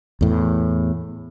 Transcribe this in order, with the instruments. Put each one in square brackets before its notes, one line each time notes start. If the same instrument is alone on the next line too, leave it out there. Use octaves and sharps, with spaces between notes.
[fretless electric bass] E2 A2